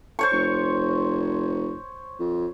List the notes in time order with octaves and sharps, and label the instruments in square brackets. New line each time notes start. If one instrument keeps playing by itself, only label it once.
[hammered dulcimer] C5 C#5 C#6
[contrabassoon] F1
F2